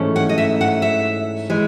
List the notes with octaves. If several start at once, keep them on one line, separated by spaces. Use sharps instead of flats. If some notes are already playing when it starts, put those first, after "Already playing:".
Already playing: G#2 E3 A3 C#4
F#5
D#5
E5
F#5
E5
E3 G#3